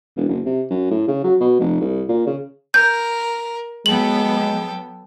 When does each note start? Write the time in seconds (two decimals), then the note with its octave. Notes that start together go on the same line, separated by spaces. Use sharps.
0.16 E1
0.29 F#1
0.45 C3
0.70 F#2
0.91 A2
1.08 C#3
1.24 F#3
1.40 B2
1.59 F1
1.81 C2
2.09 A#2
2.26 C#3
2.74 A#4 G6
3.86 F#3 G#3 B3 A4 G5 F#7